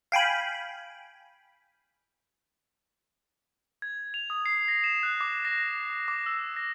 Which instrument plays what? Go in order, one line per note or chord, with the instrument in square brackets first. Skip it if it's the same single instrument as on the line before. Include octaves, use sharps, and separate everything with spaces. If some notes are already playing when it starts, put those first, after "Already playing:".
[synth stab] F5 G5 G#5 B5
[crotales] G#6
F7
D#6
C7
A#6
E7
F#6
D6
A#6
D6
E6
A#6